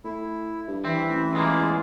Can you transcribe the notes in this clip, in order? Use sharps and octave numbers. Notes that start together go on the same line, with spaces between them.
A2 E4
G2
E3 C4 E5
A1
E2 G#3 A#3 C#4 F4 G#4